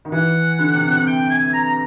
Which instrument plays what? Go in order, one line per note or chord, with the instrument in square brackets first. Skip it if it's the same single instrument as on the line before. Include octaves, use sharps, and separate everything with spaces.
[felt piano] D#3
[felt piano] E3 [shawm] F#5
[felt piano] D3
C3
C3
[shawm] G5
G#5
A#5
A#5